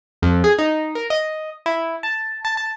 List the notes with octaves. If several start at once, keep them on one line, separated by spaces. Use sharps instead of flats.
F2
G#4
D#4
A#4
D#5
E4
A5
A5
A5